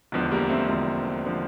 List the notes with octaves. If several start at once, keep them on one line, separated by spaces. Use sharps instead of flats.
E1 E2 D3 F3
G3 A#3
A3 C4
E1 E2 D3 F3
D3 F3